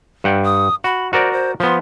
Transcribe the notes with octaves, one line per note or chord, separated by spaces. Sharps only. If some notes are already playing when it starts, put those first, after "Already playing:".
G2 F#5 G5
D#6
F#4 B5
F#4 A#4 C5 D5
C5
F3 B3 C6